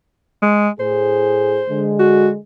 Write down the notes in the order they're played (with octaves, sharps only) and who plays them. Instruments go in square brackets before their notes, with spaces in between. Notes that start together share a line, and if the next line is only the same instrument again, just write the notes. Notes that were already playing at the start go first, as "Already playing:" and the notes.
[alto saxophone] G#3
[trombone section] A2 G#4 [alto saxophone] C5
[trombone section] D3 G#3
[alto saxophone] F#4